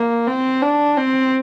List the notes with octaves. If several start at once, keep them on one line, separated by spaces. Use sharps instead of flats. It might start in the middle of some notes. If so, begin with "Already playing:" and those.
Already playing: A#3
C4
D4
C4